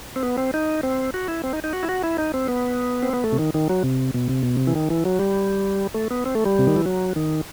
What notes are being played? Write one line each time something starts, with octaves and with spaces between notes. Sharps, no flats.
C4
B3
C4
D#4
C4
F#4
E4
C4
D#4
D#4
F#4
E4
F#4
E4
D#4
C4
B3
C4
B3
A3
C3
D#3
D#3
F#3
C3
B2
C3
B2
C3
E3
D#3
E3
F#3
G3
A3
B3
C4
A3
G3
C3
D#3
E3
F#3
D#3